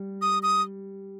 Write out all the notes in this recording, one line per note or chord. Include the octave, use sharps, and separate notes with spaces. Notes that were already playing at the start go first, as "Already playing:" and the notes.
Already playing: G3
D#6
D#6